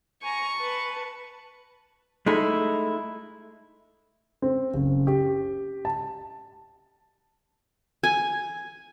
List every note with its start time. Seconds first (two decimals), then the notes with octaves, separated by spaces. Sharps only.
0.23 G#5 A#5 C#6
0.57 B4 A5
2.26 G#3 A3 D#4 E4
4.42 C4
4.74 F#1
5.07 G4
5.85 A5
8.03 G#5